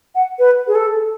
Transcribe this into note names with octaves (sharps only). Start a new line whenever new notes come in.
F#5
B4
G#4
A4